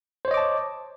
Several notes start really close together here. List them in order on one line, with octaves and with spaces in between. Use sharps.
C5 C#5 D#5 D6 A5